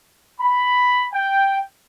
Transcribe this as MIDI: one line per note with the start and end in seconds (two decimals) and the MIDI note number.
0.41 1.05 83
1.13 1.59 79